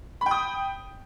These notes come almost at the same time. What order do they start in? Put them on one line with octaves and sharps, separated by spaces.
B5 G5 D#6